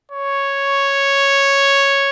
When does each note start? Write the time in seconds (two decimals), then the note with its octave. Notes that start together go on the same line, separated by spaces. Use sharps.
0.12 C#5